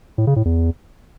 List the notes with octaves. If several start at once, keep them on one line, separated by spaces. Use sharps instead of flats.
A2
C#3
A2
E2